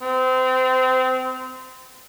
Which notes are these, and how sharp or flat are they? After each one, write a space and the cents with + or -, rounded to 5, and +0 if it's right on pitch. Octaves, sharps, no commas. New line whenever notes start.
C4 -25